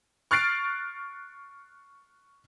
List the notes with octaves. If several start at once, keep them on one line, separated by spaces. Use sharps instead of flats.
C#6 F6 F#6 A6 C7 D7